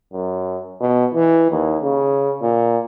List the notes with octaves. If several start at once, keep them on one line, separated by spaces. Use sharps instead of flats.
F#2
B2
E3
D#2
C#3
A#2